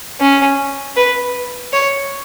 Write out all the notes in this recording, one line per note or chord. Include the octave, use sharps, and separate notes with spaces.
C#4
B4
C#5